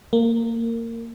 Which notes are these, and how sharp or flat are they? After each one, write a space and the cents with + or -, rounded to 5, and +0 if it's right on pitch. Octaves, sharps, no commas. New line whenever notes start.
A#3 -20